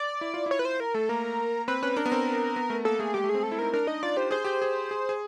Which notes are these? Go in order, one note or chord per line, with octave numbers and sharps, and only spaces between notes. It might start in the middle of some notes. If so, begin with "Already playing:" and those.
Already playing: D5
E4
F4
E4 C#5
B4
C5
A#4
A3 A4
A#3 A#4
C4 B4
C#4 B4
D4 A#4
B3
C4
B3
A3
A#3 A4
A3 G#4
G#3 G4
A3
G#4
C4
A4
E4
D#4 A#4
D4 A#4
D#4 D#5
F4 D5
G4 C5
G#4 C5
G4 C5
G#4
G#4
G#4